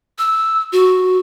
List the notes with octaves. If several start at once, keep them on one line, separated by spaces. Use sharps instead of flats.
E6
F#4